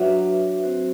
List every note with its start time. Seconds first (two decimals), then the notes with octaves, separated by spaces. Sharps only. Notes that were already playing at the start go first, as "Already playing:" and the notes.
Already playing: F#3 D4 F#4 B4 E5
0.62 C4 F#4 C5